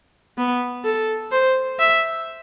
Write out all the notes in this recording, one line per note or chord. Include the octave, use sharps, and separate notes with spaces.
B3
A4
C5
E5